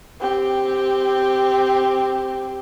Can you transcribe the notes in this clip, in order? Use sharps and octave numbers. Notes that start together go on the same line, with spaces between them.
C4 G4